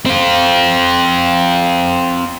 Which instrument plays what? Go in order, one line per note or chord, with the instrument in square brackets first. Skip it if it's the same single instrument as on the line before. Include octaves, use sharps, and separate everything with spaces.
[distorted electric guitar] C4 F4